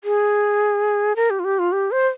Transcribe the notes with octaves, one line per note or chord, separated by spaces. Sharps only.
G#4
A#4
G4
F4
G4
F4
G4
C5